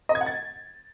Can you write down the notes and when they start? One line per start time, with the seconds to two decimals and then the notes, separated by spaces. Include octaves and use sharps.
0.09 D#5
0.15 G#6
0.21 F#5
0.26 A6